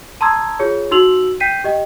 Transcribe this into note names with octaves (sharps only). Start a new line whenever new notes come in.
A5 A#5 C6 D#6 E6 G#6
F4 G#4 C#5
D#4 F#4 C6 E6 F7 F#7
G5 G6 B6 C7 D#7
G4 D#5 G5